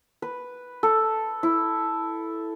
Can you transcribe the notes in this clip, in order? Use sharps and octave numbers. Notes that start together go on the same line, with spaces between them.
B4
A4
E4